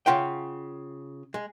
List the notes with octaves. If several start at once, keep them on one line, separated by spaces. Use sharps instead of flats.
C#3 F4 F#5 G5
G#3